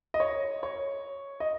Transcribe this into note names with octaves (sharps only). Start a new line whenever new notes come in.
D#5
C#5
C#5
D#5